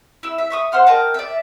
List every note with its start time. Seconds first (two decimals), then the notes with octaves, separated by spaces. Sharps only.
0.23 E4 E6
0.38 E5
0.50 E5 C#6 D#6
0.72 C5 F#5 C6 F6
0.86 A#4 D#5 G5 A5
1.14 D5 E5